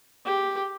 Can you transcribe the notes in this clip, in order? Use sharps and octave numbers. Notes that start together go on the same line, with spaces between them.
G4